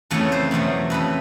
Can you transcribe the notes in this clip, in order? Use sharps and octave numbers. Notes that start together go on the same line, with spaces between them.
F2 C#3 E3 A3 C#5
C5
E2 B2 F#3 A3
F2 C#3 E3 B4